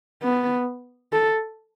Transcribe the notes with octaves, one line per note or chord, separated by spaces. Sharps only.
B3
A4